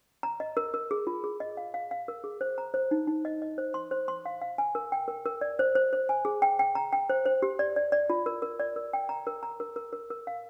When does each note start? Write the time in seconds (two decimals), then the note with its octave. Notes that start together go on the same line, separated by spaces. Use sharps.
0.23 A#5
0.40 D#5
0.57 A#4
0.74 A#4
0.91 G#4
1.07 F4
1.24 G#4
1.40 D#5
1.57 F5
1.74 F5
1.91 F5
2.08 A#4
2.24 G#4
2.41 C5
2.58 A#5
2.74 C5
2.91 D#4
3.07 D#4
3.25 D#5
3.42 D#5
3.58 C5
3.74 C6
3.91 C5
4.08 C6
4.26 F5
4.41 F5
4.58 G#5
4.75 A#4
4.92 G5
5.08 A#4
5.26 A#4
5.41 D5
5.59 C5
5.75 C5
5.93 C5
6.09 G#5
6.25 G#4
6.42 G5
6.59 G5
6.75 A#5
6.92 G5
7.10 C5
7.25 C5
7.42 G4
7.59 D5
7.76 D5
7.92 D5
8.10 F4
8.26 A#4
8.42 A#4
8.60 D5
8.76 A#4
8.93 G5
9.09 A#5
9.27 A#4
9.43 A#5
9.60 A#4
9.76 A#4
9.93 A#4
10.10 A#4
10.27 F5